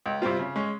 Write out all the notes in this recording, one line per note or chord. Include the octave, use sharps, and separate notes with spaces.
C#2
C3 G3 C4 F4
C#3
G#3 C#4